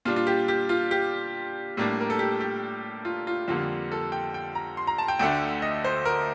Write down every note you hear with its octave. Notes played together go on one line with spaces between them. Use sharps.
A#2 G3 D4 F4
F4
G4
G4
F4
G4
A2 G3 A#3 D4
A#4
A4
G4
G4
F4
F4
F2 D3 G3 A#3 F4
A4
G5
G5
A#5
C6
A#5
A5
G5
D2 D3 A3 D4 G5
D#5
C5
A#4